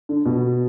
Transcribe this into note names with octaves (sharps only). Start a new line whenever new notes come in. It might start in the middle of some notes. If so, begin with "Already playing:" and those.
D3
B2